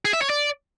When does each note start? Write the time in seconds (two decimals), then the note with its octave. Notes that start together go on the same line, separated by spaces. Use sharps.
0.05 G#4
0.13 E5
0.22 C#5
0.30 D5